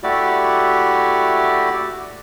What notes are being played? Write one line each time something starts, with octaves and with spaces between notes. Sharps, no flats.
A3 E4 F#4 G4 D5